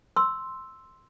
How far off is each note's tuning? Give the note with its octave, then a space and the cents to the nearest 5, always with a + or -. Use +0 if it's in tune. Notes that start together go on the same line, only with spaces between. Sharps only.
C6 +0 E6 +0